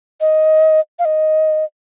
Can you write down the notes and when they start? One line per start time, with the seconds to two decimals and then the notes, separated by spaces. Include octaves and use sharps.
0.21 D#5
0.99 F5
1.05 D#5